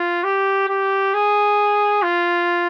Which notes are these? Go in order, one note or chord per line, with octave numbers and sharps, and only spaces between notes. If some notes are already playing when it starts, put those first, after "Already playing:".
Already playing: F4
G4
G4
G#4
F4